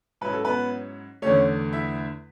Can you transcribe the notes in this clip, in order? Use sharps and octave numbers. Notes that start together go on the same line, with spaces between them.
G#2 F#3 C#4 E4 B4
A4
B3 B4
E2 D3 A3 C#4 C#5
E4 E5